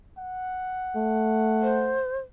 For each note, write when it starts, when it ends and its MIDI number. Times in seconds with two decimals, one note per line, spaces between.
0.18 2.04 78
0.96 2.00 57
1.62 2.17 72